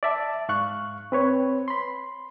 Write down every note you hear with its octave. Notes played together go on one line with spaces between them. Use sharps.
D5 E5 A5
G#2 F5 C#6 F#6
C4 B4 C#5
B5 C6